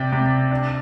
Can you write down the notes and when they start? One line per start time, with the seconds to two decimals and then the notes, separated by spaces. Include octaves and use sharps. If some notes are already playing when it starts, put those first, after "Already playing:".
Already playing: C3 D5 G5
0.12 C3
0.51 D4